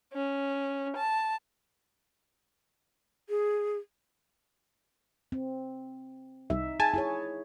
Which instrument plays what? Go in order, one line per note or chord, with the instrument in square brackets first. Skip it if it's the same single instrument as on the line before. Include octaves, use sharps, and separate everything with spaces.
[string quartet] C#4
A5
[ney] G#4
[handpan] C4
[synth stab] C2 [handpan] D#4 E5
[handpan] G#4 [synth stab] G#5 A5
[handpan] E4 G#4 C#5